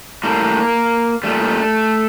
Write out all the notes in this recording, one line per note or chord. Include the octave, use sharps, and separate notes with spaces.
A2 G3 A#3
A#2 G3 A3